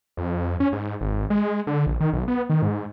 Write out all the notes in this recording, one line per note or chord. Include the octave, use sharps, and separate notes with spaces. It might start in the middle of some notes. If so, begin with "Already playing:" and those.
F2
C#4
G#2
G#1
G#3
D3
A#1
D#3
B1
B3
D#3
G#2